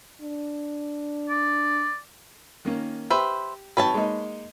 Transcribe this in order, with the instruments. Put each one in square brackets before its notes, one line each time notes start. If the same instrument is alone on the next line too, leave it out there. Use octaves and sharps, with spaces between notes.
[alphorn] D4
[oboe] D5
[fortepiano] D#3 A#3 C#4
[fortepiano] G4 [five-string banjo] B4 C5 E5
[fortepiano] G#1 F#3 G5 [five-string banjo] B4 C#5 A5
[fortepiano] G#3 A#3 D#4